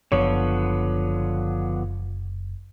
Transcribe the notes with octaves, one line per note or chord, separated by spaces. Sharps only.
F#1 D3 F3 B3 C#5